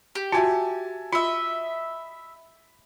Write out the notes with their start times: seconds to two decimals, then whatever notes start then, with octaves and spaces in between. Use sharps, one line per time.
0.15 G4
0.32 F4 F#4 E5 G#5 A5
1.13 F4 D#5 E5 B5